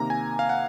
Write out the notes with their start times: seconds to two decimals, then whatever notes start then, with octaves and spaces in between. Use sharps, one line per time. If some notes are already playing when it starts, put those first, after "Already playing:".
Already playing: C3 D#3 A#3 A#5
0.10 G#5
0.39 F5
0.49 F#5